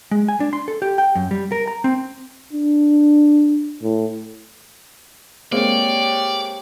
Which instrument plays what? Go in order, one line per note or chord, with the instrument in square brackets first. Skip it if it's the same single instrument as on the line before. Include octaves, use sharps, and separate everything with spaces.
[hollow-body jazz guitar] G#3
G#5
D4
C6
A4
G4
G5
F#2
G3
A#4
A#5
C4
[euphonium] D4
A2
[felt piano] G#3 A#3 C4 [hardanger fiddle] G4 C#5 [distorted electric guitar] D5